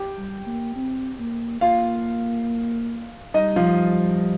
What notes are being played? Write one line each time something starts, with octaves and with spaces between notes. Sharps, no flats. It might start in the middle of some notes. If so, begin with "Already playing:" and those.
Already playing: G4 G5
G3
A#3
C4
A#3
A#3 F4 F5
G3 D#4 D#5
F3 F4